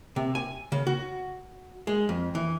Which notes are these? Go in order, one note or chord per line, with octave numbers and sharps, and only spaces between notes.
C3
G#5
C#3
F#4
G#3
F2
E3